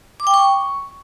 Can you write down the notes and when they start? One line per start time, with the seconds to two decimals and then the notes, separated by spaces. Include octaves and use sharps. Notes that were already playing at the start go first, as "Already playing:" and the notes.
0.20 D6
0.27 G5
0.34 C#6